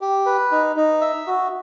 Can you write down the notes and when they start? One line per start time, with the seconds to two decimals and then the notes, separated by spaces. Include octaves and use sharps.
0.01 G4
0.26 B4
0.51 D#4
0.76 D#4
1.01 E5
1.27 F#4